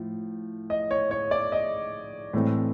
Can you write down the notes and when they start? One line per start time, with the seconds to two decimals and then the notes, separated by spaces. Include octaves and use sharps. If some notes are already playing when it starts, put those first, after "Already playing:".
Already playing: A2 F3
0.70 D#5
0.91 C#5
1.11 C#5
1.31 D5
1.52 D#5
2.33 A2 E3 A3 C4